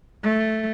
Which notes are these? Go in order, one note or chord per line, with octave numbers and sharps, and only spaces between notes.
A3